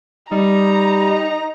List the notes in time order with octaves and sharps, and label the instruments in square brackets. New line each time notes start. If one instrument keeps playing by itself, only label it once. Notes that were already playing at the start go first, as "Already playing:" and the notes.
[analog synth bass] G3 [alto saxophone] D#4 [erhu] A#5